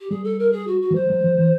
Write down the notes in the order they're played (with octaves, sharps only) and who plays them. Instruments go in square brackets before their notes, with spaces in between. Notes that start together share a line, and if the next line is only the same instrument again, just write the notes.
[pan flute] G4
[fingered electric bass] G3 [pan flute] G#4
[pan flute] A4
A#4
G#4
F#4
F#4
[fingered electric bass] F3
[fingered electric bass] F#3 [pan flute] C5
[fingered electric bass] F#3
F3
E3